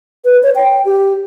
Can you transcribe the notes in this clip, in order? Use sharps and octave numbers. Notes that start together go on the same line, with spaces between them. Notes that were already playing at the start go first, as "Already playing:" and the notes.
B4
C#5
G5
G4